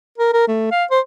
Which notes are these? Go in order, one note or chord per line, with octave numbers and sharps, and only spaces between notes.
A#4
A#4
A3
F5
C5